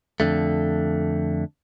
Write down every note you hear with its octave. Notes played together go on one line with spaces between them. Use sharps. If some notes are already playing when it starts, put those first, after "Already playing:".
F2 D3 A3